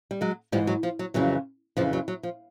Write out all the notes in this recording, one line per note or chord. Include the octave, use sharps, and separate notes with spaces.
G3
F#3 G#3
G#2 E3 F3 G3
F#3
F3
F#3
F2 C#3 E3 F#3
F2 C#3 E3 F3
F#3
F#3
F3